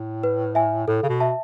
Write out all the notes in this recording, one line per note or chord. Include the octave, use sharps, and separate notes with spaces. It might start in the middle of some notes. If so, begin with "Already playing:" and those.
Already playing: A2
B4
E5 G#5
A2 A4
C#3
B2
E5 A5